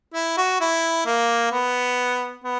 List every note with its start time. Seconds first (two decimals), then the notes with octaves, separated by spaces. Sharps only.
0.14 E4
0.37 F#4
0.61 E4
1.06 A#3
1.52 B3
2.44 B3